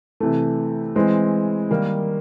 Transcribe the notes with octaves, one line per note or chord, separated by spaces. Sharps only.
C3 E3 A3
E3 G#3 C4
D#3 G3 A#3